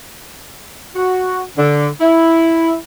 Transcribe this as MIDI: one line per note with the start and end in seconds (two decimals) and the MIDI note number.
0.96 1.42 66
1.57 1.87 50
2.00 2.75 64